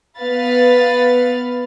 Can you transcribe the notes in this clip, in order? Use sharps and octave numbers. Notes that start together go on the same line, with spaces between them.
B3 B4 F5 A6